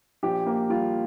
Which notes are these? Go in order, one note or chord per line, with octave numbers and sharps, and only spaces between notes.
A#1 G4
A#3
G3 F4